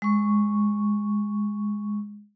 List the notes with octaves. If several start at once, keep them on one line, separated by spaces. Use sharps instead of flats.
G#3 C#6